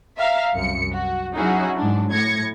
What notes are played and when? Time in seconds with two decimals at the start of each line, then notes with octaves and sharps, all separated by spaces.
0.18 E5 F5 A#5
0.53 C2 F#2 C#7
0.93 F#4
1.35 F#3 C#4 D#4 E4 F#4 G#4
1.76 G#2 F#3 D4
2.11 A2 G#6 A#6 C#7